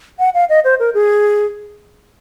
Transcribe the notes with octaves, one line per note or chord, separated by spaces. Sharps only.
F#5
F5
D#5
C5
A#4
G#4